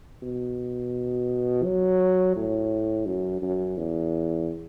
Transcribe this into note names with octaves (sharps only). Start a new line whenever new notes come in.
B2
F#3
A2
F#2
F#2
E2